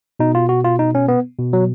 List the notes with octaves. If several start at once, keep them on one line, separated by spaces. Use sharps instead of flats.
B2 D#4
F4
F#4
F4
D#4
C#4
B3
B2
F#3